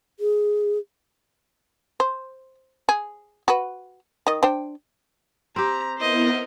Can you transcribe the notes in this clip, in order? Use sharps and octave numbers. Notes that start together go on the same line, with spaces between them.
G#4
C5
G#4
F#4 B4
D#3 D#5
D4 C5 G5
C4 G4 A#5
B3 E4 A#4 C5 D#5